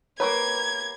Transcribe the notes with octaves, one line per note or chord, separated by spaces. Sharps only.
A#3 G4 B4 C#5 A#5 C#6 G#6